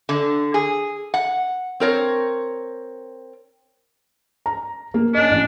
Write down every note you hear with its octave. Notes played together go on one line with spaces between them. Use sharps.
D3
G#4
F#5
C4 A#4 C#5
A#5
A#3
C#4 D4 D#5
A1